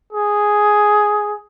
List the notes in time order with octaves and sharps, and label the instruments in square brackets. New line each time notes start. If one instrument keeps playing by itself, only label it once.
[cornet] G#4